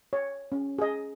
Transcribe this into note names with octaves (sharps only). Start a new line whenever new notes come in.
C#5
C#4
G#4 D#5